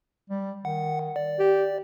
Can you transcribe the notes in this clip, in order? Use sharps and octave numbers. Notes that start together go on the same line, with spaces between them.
G3
D#3 F#5
D5
G4